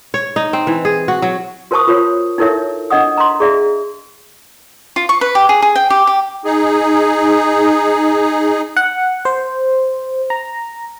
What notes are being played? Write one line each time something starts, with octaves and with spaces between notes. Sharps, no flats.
C#5
D#4
C4
E3
G#4
F#4
F#3
F#4 A#4 C5 A5 C#6 D#6
F4 A#4 C5 C#5
D#4 E4 A4 A#4 C#5 E5
D4 D#5 F#5 D#6
A#5 C6
G#4 D5 E5
F4
C#6
B4
G4
G#4
G#4
G5
G4
G4
D#4 G#4
F#5
C5
A#5